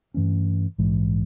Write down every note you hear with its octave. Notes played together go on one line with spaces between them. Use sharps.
G2 E3 A3 C#4
A#1 G#2 E3 G#3